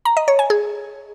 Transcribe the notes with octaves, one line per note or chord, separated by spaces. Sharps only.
A#5
D#5
C#5
G#5
G#4